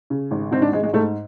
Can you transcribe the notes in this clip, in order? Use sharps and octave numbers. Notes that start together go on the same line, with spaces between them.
C#3
G#1
G#2 C4
D4
G#1 G#3
G#3
G#2 A3